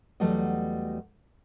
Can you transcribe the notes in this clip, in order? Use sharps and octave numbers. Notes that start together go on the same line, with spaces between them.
E2 F#3 G3 A3 F#4 D#5